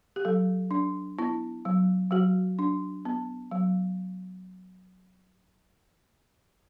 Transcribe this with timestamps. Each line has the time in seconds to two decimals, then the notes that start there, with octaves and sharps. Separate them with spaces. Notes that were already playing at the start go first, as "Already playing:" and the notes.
0.16 G4
0.25 F#3 A4
0.71 D4
1.19 B3 E4
1.65 F#3
2.11 F#3 F#4
2.59 D4
3.05 B3
3.51 F#3